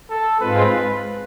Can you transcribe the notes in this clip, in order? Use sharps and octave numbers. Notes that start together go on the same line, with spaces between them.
A4
G#2 G#3 C4 F4 B4